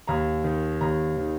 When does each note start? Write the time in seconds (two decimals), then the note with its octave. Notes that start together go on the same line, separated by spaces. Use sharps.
0.07 D#2 A#5
0.44 D#3
0.81 D#2 A#5
1.17 D#3